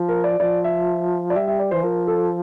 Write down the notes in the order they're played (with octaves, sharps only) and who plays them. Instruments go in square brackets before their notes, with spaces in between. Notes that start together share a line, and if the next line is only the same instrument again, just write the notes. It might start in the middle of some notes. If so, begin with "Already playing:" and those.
Already playing: [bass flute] F3
[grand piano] A#4
D5
[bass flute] F3 [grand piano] D5
[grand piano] E5
D5
[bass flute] G3 [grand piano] E5
[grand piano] E5
D5
[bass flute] E3 [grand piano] C5
[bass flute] F3 [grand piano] A#4
[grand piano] A4